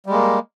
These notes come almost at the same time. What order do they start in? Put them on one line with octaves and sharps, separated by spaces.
G3 G#3 A#3